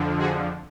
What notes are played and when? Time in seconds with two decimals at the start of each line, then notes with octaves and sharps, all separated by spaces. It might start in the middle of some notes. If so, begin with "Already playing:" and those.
Already playing: F2 D3 F3
0.19 F#4 G#4